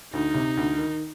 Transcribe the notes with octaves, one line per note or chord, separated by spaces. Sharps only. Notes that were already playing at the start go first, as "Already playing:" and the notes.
D2 D#4
C3
D2
D#3